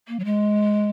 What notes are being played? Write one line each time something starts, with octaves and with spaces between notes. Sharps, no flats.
A#3
F#3
G#3